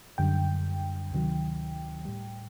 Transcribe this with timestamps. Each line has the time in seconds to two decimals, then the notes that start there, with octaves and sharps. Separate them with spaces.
0.18 F#2 D3 G3 G5
1.11 D2 C3 D#3 F#3
2.05 A2 G3